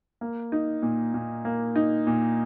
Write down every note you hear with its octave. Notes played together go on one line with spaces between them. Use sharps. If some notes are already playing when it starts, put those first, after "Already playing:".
A#3
D#4
A#2
A#2
A#3
D#4
A#2